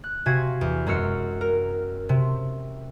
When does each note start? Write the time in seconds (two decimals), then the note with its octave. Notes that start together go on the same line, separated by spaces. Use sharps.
0.04 F#6
0.26 C3 F#4 F5 G#5 G#6 B6
0.61 E2
0.86 F#2 G#3 F#4 E6 F6 C#7
1.41 A#4
2.09 C3